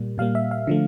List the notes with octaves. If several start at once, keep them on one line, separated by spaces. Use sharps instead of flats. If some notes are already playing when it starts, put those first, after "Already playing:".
Already playing: A#2 G3 A#3
A#2 G3 A#3 F5
E5
F5
D3 F3 A3